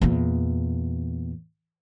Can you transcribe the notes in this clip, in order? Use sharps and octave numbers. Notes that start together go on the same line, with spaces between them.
E2 A#2